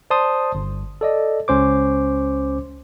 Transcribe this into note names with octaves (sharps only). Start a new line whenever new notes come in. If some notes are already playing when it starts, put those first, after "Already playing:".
C5 D5 A5 C6 D#6
G1
A4 D5 D#5
C#2 C#4 C5 D6